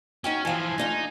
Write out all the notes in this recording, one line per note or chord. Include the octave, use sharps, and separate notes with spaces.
C#4 D#4 F#4 G5
E3 F3 A4 F5 G#5
A3 D4 D#4 F4